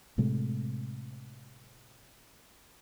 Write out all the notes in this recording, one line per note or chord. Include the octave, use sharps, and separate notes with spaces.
A2 C3 G#3 A3